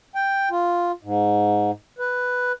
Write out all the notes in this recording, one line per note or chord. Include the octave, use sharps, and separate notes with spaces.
G5
F4
G#2
B4